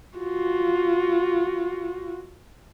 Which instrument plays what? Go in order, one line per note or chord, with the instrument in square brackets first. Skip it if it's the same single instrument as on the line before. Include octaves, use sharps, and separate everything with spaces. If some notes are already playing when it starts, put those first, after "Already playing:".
[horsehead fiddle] F4 F#4